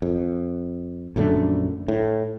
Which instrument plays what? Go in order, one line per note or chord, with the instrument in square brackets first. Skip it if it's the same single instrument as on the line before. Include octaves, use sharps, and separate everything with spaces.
[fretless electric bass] F2
A#1 F#2 D3 A3
A2